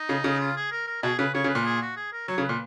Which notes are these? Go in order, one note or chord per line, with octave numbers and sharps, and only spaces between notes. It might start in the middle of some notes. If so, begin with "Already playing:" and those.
Already playing: D#4
C#3
C#3
F4
G#4
A#4
A#4
B2 G#4
C#3 B4
C#3 C#5
C#3
B4
A#2
G#4
F#4
G#4
A#4
F#3 C#5
C#3
B4
A#2